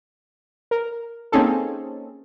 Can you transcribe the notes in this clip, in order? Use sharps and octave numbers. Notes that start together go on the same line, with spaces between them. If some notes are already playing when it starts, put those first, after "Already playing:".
A#4
A#3 C4 C#4 D#4 G#4 A4